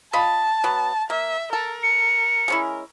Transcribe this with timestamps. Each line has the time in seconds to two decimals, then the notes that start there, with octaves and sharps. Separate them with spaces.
0.13 F4 D#5 A5 B5
0.64 F#3 B3
1.10 A#3 E5
1.53 A4 A#4
1.83 C#7
2.48 G#3 C#4 E4